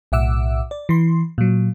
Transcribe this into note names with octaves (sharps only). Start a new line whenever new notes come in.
B1 A2 E5 F#5 D6 E6
D5
E3 C6
A#2 F#3